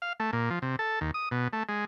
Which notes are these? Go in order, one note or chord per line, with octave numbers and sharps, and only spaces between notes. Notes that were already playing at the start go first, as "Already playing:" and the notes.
F5
A3
A#2
F3
C3
A4
D#2
D#6
B2
A3
G#3